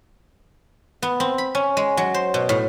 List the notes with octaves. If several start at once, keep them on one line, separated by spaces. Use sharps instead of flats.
B3
C4
B5
C#4
G#3
F#3
C5
B2
A2